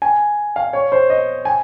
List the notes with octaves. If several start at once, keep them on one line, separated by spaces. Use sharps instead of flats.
G#5
F5
C#5
C5
D#5
G#5